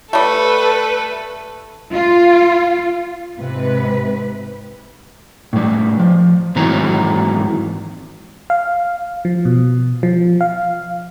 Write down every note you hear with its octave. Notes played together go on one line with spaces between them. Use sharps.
G3 A3 A4 B4
F4
G#2 C3 B4
A2 G3
F3
G#2 D#3 E3 F#3 C4 A#5
F5
F3
B2
F3
F5